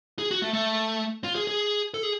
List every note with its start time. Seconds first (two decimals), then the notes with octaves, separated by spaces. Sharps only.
0.19 G#4
0.31 F#4
0.42 A3
0.53 A3
1.24 F4
1.35 G#4
1.47 G#4
1.94 A4
2.03 G#4